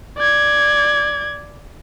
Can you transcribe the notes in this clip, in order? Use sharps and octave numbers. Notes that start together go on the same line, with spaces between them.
D5 G#6